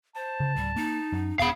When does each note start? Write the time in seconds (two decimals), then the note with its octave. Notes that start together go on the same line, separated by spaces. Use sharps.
0.16 C5 A5
0.40 C#3
0.56 D1 G3
0.76 A#3 D#4
1.13 F#2
1.39 E1 B3 F5 B5